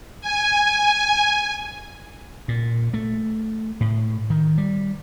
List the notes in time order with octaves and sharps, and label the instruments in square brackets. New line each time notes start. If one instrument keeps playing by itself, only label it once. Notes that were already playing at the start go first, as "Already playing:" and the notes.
[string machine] G#5
[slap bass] A#2
A3
A2
D#3
G3